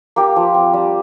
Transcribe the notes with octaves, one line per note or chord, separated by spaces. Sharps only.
A#3 G4
F3
C4
G3